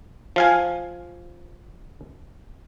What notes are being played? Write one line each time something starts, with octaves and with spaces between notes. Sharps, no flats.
F3 F5 G#5